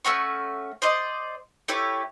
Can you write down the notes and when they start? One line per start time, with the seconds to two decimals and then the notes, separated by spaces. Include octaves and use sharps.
0.05 A3 C#4 F#4 C#6
0.82 C5 D5 D#5
1.68 A3 E4 G4 C#5